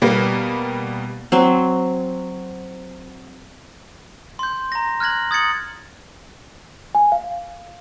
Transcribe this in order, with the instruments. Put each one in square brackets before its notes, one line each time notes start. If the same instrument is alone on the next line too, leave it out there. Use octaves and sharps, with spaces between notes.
[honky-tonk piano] B2 G3 A#3 B3
[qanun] F#3 C4
[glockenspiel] C6 G6
A#5 A#6
F6 F#6 G#6 A#6 F#7
D#6 G#6 A6 C#7 F#7
[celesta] G#5
F5